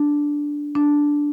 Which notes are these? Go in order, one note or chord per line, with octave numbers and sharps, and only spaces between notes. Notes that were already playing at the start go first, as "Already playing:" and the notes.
Already playing: D4
D4